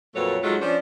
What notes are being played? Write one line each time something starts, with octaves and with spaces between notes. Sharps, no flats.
F2 A#2 F#3 A3 B4 C#5
G#2 F#3 G#3 A3 F4 F#4
F3 C#4 D4